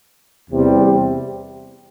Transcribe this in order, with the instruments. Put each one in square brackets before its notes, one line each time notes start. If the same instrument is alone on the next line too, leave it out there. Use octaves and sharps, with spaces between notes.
[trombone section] E2 C3 G3